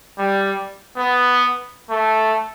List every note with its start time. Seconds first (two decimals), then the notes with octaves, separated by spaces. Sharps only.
0.18 G3
0.97 B3
1.90 A3